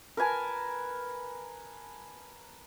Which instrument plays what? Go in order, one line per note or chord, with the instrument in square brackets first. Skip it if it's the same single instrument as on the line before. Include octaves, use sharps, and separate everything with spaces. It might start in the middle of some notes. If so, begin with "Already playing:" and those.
[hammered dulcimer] A#4 B4 G#5 A5